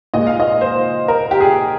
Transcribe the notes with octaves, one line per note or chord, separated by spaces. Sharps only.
A#2 G#3 D#5
F5
D#5
C5
A#4
G4
G#4